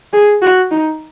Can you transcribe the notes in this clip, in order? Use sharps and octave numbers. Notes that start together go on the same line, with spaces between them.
G#4
F#4
D#4